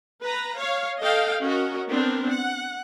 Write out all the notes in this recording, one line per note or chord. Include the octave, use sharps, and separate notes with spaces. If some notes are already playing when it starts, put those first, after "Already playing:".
B4 A#5
C#5 F5
A4 D#5 F5 G5
C#4 F#4 A#4 D#5
B3 C4 D4 A#4
F#5